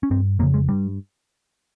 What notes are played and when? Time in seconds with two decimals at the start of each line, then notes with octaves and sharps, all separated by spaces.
0.03 C#4
0.11 G2 C4
0.39 F2 A#3
0.43 C#3
0.54 G#3
0.69 G2 G3